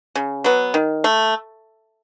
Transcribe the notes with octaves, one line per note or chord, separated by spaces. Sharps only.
C#3
F#3 B3
D#3
A3